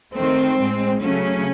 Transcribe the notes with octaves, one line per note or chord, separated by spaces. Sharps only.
D#3 A3 C4
A2 G#3
C#3 F#3 A3 C#4